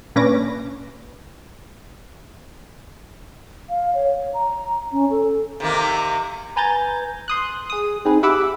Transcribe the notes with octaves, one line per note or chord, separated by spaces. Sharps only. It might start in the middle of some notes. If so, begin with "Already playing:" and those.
A#2 C#4 D4 B4 D6 A#6
F5
C#5
A#5
C#4
A4
C3 D#3 A#3
B4 G#5 A#5 G6 A6
C6 D#6 F#6
G#4 D#6
C4 D#4 G#4 B4
G4 E5 F#5 B5 D6 E6